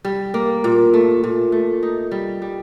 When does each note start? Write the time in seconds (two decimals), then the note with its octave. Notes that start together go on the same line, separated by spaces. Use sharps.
0.05 G3
0.34 A#3
0.64 A#2
0.94 A3
1.24 A#2
1.52 A3
1.83 D#4
2.11 G3
2.42 G3